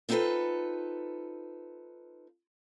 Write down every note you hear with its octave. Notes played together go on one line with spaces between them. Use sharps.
B3 C4 D#4 F4 A4 B4